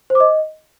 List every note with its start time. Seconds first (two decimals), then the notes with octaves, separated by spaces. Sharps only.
0.10 C5
0.15 D6
0.20 D#5